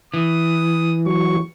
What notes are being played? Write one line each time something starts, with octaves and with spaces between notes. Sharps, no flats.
E3 D#6
F#3 C#6